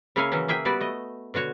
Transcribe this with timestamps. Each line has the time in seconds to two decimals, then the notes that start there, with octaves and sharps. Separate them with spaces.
0.16 C#3 A#3 E4 C#5 F5 G#5
0.32 E3 F#3 C#4
0.48 A#3 G#4 E5 G5
0.65 G3 B3 F#4 D5
0.80 A3 D#5
1.34 B2 D3 F#4 C#5